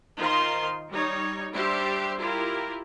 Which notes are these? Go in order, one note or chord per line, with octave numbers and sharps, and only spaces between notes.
D#3 D#4 F4 C5 C6
G3 D#4 C#5
G3 D4 G4 C5 E5 C6
E4 F4 G4 A#4